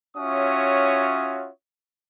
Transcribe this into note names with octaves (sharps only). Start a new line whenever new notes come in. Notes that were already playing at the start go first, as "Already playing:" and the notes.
C#4 F4 F#4 C#5 E5 D#6